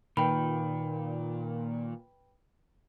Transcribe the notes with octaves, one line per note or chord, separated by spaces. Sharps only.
A#2 D#3 B4 G5 B5